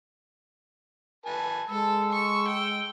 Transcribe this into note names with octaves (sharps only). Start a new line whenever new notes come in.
B4 G#5 A5
G#3 A4 E6
C#6
G5